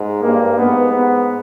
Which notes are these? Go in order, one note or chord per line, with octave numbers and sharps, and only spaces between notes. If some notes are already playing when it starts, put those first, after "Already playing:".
Already playing: G#2
G2 A#3
G#2 B3
B3